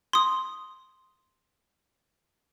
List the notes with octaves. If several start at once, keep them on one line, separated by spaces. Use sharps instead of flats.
C6 D#6